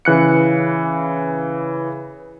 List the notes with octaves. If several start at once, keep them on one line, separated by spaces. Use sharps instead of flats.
C#3 E3 F#6 C#7